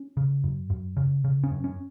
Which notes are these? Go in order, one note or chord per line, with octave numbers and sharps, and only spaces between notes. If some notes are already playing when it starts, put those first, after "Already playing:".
Already playing: C#4
C#3
F#2
F#2
C#3
C#3
C#4
F#2
C#4